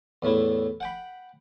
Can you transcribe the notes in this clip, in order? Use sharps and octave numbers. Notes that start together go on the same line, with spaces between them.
E2 A2 A3 E4
F#5 G5 B5